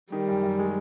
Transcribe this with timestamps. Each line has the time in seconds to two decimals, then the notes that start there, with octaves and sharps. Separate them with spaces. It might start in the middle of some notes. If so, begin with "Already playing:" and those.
0.12 D#3 G3
0.28 F#2
0.43 F#2
0.59 G#3